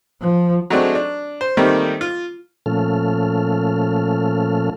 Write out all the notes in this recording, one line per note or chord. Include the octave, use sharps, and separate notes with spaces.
F3
F#3 G#3 A3 C4 D4
D4
C5
D#3 G3 A3 A#3 C4 D#4
F4
A#2 F3 A3 C#4 A4 F6